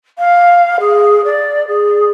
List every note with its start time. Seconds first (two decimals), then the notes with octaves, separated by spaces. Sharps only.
0.18 F5
0.80 G#4
1.24 D5
1.67 G#4